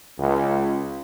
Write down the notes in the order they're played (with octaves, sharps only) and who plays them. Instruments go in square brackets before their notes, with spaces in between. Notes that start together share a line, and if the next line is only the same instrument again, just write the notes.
[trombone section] C#2